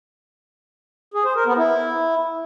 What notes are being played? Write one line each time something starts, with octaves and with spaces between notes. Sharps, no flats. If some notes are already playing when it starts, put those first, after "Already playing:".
G#4
C5
A#4
B3
E4